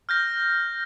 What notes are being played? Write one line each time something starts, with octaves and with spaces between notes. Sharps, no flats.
F6 G6 A#6